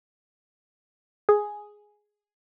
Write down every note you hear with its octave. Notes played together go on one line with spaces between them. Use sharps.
G#4